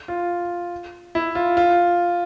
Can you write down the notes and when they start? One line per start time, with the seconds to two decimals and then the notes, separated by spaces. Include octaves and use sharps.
0.08 F4
1.15 E4
1.35 F4
1.57 F4